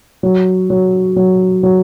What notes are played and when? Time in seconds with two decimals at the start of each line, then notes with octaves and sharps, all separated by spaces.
0.23 F#3
0.70 F#3
1.16 F#3
1.63 F#3